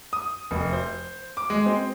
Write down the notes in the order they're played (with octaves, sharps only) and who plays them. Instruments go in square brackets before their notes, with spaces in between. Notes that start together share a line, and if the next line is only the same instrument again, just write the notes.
[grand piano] D#6
F1
C5
D6
G#3
C4